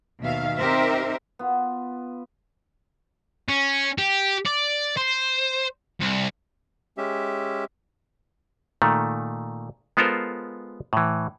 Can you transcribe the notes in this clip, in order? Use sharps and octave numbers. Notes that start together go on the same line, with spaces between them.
D#2 B2 D#3 E5 F5
C4 D#4 G4 A#4 C5 E5
B3 F4
C#4
G4
D5
C5
C2
G#3 C#4 G4 E5
A#2 D#3 A3
G#3 B3 F4 A4 A#4 C5
A2 E3